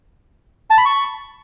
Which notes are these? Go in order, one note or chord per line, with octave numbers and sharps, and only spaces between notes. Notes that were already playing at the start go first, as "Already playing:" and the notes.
A5
B5
C#6